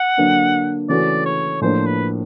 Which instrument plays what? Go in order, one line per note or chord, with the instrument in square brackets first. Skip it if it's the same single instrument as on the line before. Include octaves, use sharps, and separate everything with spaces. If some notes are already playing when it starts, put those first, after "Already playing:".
Already playing: [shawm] F#5
[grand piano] D3 F#3 A#3 D4
[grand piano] C#3 E3 A3 C#4 F#4 [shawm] D5
[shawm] C#5
[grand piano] A2 F3 A#3 D4 [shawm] C5
[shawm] B4